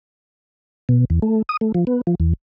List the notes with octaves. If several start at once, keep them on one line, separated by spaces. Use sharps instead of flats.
B2
E2
A3
D#6
A3
F3
B3
F3
E2